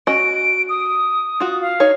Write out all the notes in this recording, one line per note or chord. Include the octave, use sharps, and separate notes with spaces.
C#4 F#4 D#5 D7
D#6
F4 F#4
F5
D#4 C#5